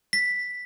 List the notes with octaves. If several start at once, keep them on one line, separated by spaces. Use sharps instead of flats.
B6